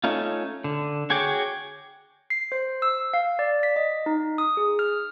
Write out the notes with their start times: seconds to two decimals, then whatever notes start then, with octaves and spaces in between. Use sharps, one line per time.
0.04 A3 C#4 D#4 F4
0.64 D3
1.10 F#4 G#4 C#5 G5 D6
2.30 C7
2.52 C5
2.82 E6
3.13 F5
3.39 D5
3.63 B6
3.76 D#5
4.06 D#4
4.38 D#6
4.57 G#4
4.79 F6